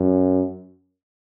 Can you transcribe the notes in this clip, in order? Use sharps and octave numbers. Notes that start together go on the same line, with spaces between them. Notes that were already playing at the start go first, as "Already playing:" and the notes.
Already playing: F#2